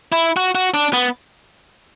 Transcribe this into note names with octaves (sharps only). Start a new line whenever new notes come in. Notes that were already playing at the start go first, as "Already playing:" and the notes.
E4
F#4
F#4
D4
B3